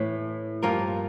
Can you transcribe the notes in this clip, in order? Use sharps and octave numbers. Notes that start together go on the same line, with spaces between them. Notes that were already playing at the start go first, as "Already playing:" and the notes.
Already playing: A2 E3 A3
G2 F3 A#3 F4 A#4